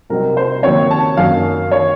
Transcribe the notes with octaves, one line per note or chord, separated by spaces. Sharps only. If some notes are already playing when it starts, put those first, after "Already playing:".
C2 C3 F#3 C4 D#4 A#4
C5
D#2 D#3 F#3 C4 C#5
A5
F#2 D#3 F#3 A#3 F5
D#3 C#5